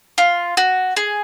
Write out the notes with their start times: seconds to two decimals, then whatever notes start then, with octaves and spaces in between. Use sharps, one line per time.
0.18 F4
0.57 F#4
0.97 G#4